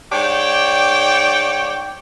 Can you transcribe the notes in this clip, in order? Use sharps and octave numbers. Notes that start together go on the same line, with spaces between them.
G#2 C#5 D5 G5